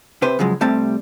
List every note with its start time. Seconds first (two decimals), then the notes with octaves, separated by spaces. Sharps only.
0.22 C3 B4 C5
0.39 C#3 F3 F#3 G#3
0.61 C3 G3 A3 C4 G4 A5